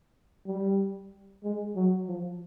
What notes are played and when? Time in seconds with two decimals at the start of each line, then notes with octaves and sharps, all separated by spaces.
0.47 G3
1.44 G#3
1.76 F#3
2.08 F3